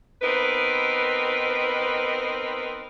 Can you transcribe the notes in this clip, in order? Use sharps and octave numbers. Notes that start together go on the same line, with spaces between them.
B3 C4 D#4 A#4 B4